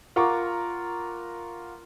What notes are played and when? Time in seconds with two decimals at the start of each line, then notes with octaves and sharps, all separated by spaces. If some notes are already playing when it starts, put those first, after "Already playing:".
0.16 F4 A#4 F#5 A#5 C#6 D6